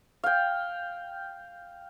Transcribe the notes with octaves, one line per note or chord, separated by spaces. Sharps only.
F5 G5